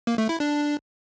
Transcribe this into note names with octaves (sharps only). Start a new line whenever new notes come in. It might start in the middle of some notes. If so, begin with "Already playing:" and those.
A#3
A3
E4
D4